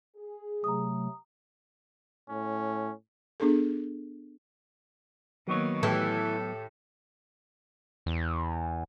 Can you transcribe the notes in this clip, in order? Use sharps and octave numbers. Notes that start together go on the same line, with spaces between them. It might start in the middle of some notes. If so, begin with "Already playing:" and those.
G#4
C3 F#3 A3 A#5 D#6
A2 C#4
B3 D4 G#4 A4
D#3 F#3 A#3 B3 C#5
A2 E3 G4 A4
E2